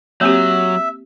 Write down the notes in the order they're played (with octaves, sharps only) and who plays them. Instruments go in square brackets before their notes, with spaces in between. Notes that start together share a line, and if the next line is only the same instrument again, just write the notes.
[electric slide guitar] F#3 [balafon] A#3 C4 G4 [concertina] E5